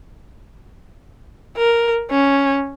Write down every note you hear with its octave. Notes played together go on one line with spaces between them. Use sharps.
A#4
C#4